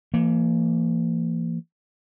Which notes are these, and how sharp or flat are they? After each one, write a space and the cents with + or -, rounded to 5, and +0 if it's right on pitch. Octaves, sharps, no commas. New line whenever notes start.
E3 +35 A#3 -20